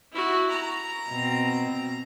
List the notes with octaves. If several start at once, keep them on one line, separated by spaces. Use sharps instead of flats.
E4 F#4
A#5
B2 C4